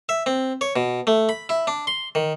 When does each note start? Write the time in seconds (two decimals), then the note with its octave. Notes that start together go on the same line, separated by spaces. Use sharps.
0.09 E5
0.26 C4
0.61 C#5
0.76 B2
1.07 A3
1.29 B5
1.49 E4
1.67 D4
1.87 C6
2.15 D#3